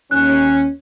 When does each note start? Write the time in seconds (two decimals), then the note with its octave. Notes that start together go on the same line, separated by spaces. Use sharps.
0.11 D#2 C#4 F#6